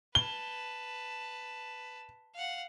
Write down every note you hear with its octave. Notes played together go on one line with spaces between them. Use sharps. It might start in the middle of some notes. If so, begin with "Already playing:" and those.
B4 A5 G7
F5 F#5